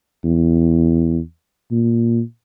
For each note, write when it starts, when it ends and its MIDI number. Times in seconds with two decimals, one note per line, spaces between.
0.24 1.20 40
1.71 2.21 46